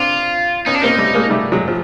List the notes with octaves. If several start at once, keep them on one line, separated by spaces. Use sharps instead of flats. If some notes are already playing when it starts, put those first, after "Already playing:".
Already playing: C4 D4 F4
B3 C#4 D#4
D4
A#3 C4 D#4
G3 A3
G#3 A#3
G3 A3
F#3 G#3
F3